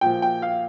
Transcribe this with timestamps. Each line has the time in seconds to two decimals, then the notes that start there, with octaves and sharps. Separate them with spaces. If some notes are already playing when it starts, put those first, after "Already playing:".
0.01 A#2 F3 G5
0.22 G5
0.42 F5